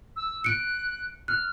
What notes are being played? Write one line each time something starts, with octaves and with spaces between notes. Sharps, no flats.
E6
F#6 C#7 D7
F6 F#6